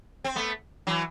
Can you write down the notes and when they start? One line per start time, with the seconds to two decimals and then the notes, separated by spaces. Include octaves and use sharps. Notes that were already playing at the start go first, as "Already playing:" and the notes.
0.24 C4
0.36 A3 B3
0.87 E3 F#3